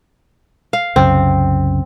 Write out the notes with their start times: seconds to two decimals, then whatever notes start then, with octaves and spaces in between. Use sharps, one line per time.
0.73 F5
0.96 C2 F#2 C#3 C4